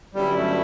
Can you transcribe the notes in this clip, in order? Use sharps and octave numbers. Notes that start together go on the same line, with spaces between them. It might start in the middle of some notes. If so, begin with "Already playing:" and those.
G1 G2 F#3 G3 C#4 E4
A3